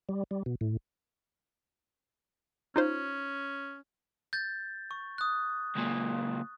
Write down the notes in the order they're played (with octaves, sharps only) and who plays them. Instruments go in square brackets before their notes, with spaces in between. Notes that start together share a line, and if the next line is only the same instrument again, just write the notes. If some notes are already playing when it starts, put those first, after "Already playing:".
[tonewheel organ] G3
G3
B2
A2
[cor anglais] C#4 [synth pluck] D#4 F4 C5
[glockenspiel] G6 A6
C#6
D#6 F#6
[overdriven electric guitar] C#2 A#2